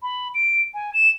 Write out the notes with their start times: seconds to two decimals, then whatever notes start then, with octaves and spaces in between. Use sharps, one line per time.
0.02 B5
0.34 D7
0.74 G#5
0.94 E7